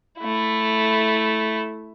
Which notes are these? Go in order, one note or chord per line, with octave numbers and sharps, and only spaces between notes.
A3 E4